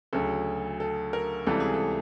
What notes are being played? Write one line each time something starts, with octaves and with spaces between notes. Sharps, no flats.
D2 C#3 F#3 A4
A4
A#4
C#2 C3 E3 G3 A4
G#4
A4